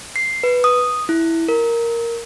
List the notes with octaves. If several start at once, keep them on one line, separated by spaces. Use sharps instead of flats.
C7
B4
D#6
E4
A#4